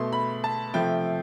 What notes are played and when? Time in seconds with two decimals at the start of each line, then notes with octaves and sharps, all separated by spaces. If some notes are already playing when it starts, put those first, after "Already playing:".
Already playing: B2 A3 C6
0.12 B5
0.44 A5
0.74 C3 F3 A3 G5